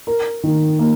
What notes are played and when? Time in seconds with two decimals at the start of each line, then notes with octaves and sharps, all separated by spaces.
0.07 A#4
0.43 D#3
0.79 A#3